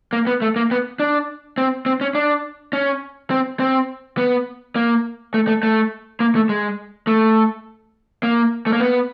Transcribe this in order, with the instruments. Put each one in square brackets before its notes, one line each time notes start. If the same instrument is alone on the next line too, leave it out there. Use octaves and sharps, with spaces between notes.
[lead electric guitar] A#3
B3
A3
A#3
B3
D4
C4
C4
C#4
D4
C#4
C4
C4
B3
A#3
A3
A3
A3
A#3
A3
G#3
A3
A#3
A3
A#3
B3